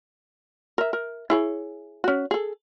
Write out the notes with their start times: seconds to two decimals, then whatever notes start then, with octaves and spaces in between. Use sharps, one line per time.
0.78 A#4 E5
0.93 A#4
1.30 E4 G#4 C#5
2.04 C#4 F#4
2.31 G#4 A4